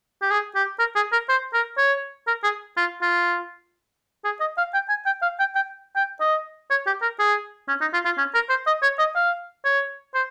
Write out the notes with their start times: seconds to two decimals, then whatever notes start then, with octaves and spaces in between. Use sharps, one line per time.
0.22 G4
0.31 G#4
0.55 G4
0.80 A#4
0.96 G#4
1.13 A#4
1.29 C5
1.54 A#4
1.78 C#5
2.28 A#4
2.44 G#4
2.77 F4
3.02 F4
4.25 G#4
4.40 D#5
4.58 F5
4.74 G5
4.89 G#5
5.06 G5
5.22 F5
5.40 G5
5.56 G5
5.96 G5
6.20 D#5
6.71 C#5
6.87 G4
7.02 A#4
7.19 G#4
7.68 C#4
7.81 D#4
7.94 F4
8.05 F4
8.18 C#4
8.35 A#4
8.50 C5
8.67 D#5
8.83 C#5
8.99 D#5
9.16 F5
9.65 C#5
10.15 C5